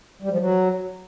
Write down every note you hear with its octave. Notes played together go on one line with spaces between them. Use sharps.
G3
F3
F#3